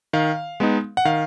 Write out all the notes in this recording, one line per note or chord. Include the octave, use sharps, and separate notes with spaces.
D#3 F5
G#3 B3 D#4
F#5
D#3 F5